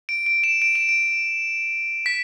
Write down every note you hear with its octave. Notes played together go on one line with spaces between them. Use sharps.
D7
D7
E7
D7
E7
D7
B6